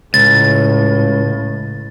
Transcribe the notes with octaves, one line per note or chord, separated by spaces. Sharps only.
C#2 A2 A6